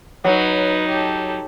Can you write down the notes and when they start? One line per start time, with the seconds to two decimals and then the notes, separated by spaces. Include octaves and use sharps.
0.24 F#3 D#4 B4
0.88 G4 A4